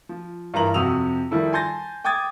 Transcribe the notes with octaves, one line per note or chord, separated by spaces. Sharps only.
F3
G2 E3 A#4 A#5 F#7
F2 C3 F#4 D#6 E6 F7
D#3 F3 G3 E4 A4
G#5 A5 C6 G6 A6 A#6
G5 D6 D#6 G#6 A6